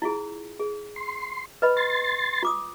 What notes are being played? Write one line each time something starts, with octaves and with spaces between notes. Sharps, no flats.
E4 F4 G#4
G#4
C6
B4 D#5 B5
C6 A6
F4 D6 D#6